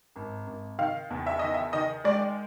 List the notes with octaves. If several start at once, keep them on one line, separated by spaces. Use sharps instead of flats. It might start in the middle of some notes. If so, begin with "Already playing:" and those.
G#1
G#1
D#3 F5
E2
E5
D#3 D#5
E5
D#3 D#5
G#3 D5